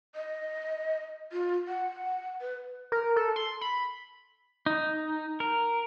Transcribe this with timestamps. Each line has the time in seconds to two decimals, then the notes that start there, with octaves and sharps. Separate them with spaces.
0.15 D#5
1.32 F4
1.68 F#5
2.41 B4
2.92 A#4
3.16 A4
3.36 C6
3.61 B5
4.66 D#4
5.40 A#4